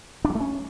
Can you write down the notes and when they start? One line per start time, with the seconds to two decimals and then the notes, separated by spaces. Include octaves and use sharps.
0.25 D4
0.30 F#3
0.35 A3
0.40 C#4